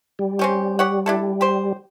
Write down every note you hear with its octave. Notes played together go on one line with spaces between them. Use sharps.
G3
C4 C#4 G4
G4 C#5 F#5
D4 E4 A4
G4 C5